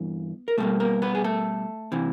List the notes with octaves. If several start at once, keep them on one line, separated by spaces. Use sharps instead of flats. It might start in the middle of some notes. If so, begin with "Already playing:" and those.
Already playing: G2 E3 B3
A#4
B2 G3 A3 A#3 A4
A#3 A#4
B3 B4
G#4
A3 A4
C3 E3